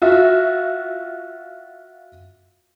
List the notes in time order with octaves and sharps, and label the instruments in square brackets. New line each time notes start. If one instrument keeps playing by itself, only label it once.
[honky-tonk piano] F4 F#4 E5